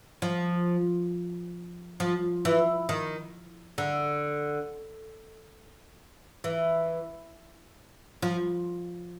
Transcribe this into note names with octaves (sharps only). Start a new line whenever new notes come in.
F3
F3
E3
D#3
D3
E3
F3